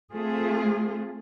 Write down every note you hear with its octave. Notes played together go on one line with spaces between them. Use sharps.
A3 C4 F4 G#4